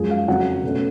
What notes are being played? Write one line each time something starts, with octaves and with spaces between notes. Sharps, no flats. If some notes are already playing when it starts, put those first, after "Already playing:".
Already playing: F#2 F3 G#3 G#4
F5
F2 C#3 F#3 F#5
B2 A3 C#4